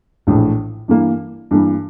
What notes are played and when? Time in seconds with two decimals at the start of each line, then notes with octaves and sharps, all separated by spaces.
0.27 A#1 A2 E3
0.88 G2 E3 A#3
1.51 G2 E3 A#3